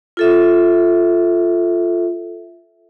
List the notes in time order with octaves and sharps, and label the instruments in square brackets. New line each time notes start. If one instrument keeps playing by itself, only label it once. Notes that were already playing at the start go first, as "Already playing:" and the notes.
[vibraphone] F4 A4 E5